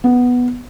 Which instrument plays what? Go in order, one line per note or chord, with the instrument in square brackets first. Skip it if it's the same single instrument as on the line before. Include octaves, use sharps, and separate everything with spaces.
[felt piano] B3